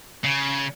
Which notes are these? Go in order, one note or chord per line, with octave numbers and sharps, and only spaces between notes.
C#3